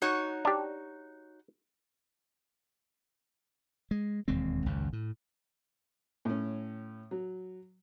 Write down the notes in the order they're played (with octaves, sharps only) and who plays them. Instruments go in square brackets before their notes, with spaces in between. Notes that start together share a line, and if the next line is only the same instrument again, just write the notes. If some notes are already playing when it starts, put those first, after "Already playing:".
[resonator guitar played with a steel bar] D#4 F#4 C#5
[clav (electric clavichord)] D4 G4
[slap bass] G#3
E1 D#2 G#3 C4
G#1 C#2 F#2
A2
[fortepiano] A2 C#4
F#3